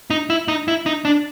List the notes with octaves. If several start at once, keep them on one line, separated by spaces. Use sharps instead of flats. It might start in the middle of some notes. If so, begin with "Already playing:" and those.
D#4
E4
D#4
E4
D#4
D4